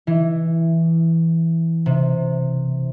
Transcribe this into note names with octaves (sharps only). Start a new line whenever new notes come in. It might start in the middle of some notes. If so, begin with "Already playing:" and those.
E3
C3